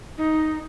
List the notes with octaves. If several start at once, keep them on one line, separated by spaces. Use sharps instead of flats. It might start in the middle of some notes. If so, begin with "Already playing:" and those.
D#4